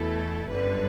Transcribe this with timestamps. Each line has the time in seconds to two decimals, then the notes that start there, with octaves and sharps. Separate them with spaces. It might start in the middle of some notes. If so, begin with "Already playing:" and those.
Already playing: E2 B2 A3 E4 A4
0.49 G1 F#2 D3 G3 B4